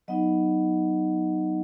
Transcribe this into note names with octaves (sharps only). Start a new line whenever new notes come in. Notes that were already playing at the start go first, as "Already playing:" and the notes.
F#3 B3 D#4 D#5 F#5